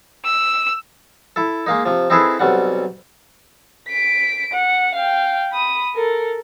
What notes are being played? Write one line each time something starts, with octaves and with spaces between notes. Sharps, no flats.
E6
E4 A4
G#3 A#3 D#4
C3 F3
C4 D#4 E4 G#4 A4 B4
B1 C3 G3 F#5
B6 D7
F#5
F5 G5
B5 D#6
A4 A#4